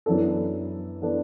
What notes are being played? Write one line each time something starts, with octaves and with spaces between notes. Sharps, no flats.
F#2 E3 B3 D4 A4
E3 B3 D4 A4